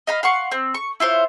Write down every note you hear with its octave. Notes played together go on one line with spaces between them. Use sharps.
D#5 F5 B5
F5 F#5 C6 C#6
C4
C#6
E4 F4 C5 C#5